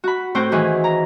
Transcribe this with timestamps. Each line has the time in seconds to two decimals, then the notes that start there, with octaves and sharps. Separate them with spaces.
0.04 F#4 B5
0.35 A2 C4 F#4 C5 G5
0.52 D#3 E3 F#4 G#4
0.84 A#5